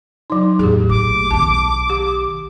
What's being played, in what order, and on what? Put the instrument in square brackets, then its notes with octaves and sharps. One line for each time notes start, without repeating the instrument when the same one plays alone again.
[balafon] F#3 D#4
[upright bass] E2 A2 [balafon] G4 G#4
[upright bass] A#1 A3 [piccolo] D6
[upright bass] B1 D#3 [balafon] A5
[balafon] G4